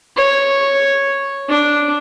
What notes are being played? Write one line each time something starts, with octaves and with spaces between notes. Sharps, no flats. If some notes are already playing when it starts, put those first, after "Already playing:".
C#5
D4